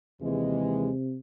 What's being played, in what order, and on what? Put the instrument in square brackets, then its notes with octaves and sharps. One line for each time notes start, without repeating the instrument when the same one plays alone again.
[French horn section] D#2 E3 G#3 [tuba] C3